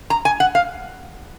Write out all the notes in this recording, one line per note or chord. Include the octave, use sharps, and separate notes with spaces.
A#5
G#5
F#5
F5